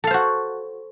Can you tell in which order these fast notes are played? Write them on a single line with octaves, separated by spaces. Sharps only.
A4 F5 C5 F#4